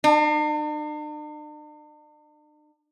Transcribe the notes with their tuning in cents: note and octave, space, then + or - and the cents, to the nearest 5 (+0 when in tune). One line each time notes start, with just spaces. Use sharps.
D4 +45